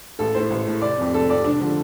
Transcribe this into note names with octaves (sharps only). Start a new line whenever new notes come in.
A1 A4
A2 A3 C5
A1
A2 A3
F1 D5
F2 C3
F1 A4
F2 C3 D5
F1 D4
D3 F3 A3